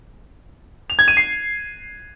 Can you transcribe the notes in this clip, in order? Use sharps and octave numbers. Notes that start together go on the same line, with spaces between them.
F7
G#6
D#7
C7